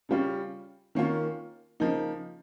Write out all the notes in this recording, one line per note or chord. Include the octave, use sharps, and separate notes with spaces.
C#3 G3 C#4 F4
D#3 A#3 C#4 F4
C#3 F3 A#3 D#4